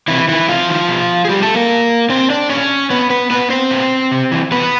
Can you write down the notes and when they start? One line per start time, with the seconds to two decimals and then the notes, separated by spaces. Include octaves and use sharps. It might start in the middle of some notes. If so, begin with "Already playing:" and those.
0.08 C3 E3 E4
0.28 D#3 E3 E4
0.48 C3 F3 F4
0.69 D#3
0.88 B2
1.25 G#4
1.29 B2 G3 G4
1.42 A3 A4
1.56 A#3 A#4
1.69 A#2
2.09 A#2 C4 C5
2.30 D4 D5
2.49 A#2 C#4 C#5
2.90 A#2 B3 B4
3.10 B3 B4
3.30 A#2 B3 B4
3.50 C4 C5
3.71 A#2
4.11 C3
4.31 E3
4.51 C3 B3 B4